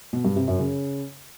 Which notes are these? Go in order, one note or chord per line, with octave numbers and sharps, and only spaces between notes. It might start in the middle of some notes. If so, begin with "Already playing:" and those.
B2
G2
C3
F#2
C#3